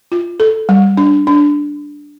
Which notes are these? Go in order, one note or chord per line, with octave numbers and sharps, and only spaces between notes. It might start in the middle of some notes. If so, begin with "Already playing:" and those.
F4
A4
G3
D4
D4